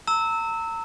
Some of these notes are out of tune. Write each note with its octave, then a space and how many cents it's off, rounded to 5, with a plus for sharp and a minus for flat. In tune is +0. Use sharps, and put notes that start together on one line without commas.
A#5 -40 E6 -15